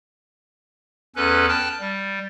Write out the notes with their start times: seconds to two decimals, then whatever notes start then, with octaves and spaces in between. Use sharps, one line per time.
1.16 E2 C#4 A4 B4 F#6
1.49 G5 A5 F6 F#6
1.80 G3